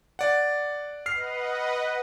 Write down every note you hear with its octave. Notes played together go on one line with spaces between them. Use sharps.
D5 F#5
B4 D#5 F#5 F6 C7